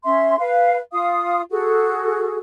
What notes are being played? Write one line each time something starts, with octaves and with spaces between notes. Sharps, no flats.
C#4 E5 C6
B4 F5
F4 F5 D#6
F#4 G#4 A4